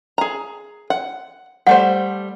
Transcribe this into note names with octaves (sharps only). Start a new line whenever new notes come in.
G#4 A#5
F#5
G3 A3 C5 F#5